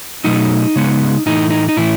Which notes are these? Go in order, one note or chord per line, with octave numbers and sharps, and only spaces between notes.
B2 F#3 A3 D#4
C#3 G#3 B3
A2 E3 A3 D#4
D#4
D#4
A2 E3 A3 E4